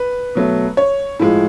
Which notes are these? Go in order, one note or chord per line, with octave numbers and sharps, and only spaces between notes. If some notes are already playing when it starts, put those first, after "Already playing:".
Already playing: B4
B2 F#3 A3
C#5
A2 F3 G#3